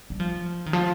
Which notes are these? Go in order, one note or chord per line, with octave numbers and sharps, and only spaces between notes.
G3
F3
D#3
F3